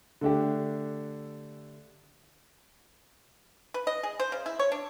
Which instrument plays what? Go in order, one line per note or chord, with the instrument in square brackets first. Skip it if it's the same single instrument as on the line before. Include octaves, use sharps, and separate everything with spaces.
[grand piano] D3 A3 D4 G4
[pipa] B4
D#5
G#4
C5
C#3
E4
C#5
D4